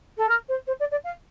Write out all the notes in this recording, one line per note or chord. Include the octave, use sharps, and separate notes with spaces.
A4
A#4
C5
C5
D5
D5
F5